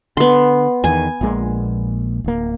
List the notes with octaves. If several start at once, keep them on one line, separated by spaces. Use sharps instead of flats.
D3 B3 C6
E2 D#3 G#5
A#1 A#2 G#3
D1 A#3